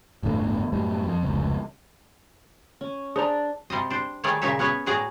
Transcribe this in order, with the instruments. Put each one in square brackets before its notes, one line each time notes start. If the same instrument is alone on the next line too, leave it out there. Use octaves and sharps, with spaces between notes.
[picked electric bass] G1 E2 A2 D3
F#2 A2 G3
F2
F1 C#2
[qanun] C#4
[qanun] D4 [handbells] G#4 C5 A#5
[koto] C3 G3 C5 D#5
D4 C5
D#3 G3 A3 G#4 C#5 D5
A#2 C#3 D#4 C#5 E5
B3 C#4 G#4 B4 C#5
A2 F#4 G#4 D5 D#5 A#5